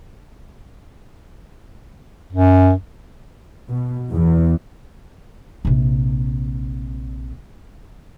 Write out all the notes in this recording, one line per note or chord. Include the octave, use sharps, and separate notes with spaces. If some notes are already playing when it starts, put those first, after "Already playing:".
F#2
B2
E2
A#1 C3